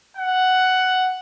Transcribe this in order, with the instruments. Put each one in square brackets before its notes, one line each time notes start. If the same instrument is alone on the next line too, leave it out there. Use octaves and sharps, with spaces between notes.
[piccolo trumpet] F#5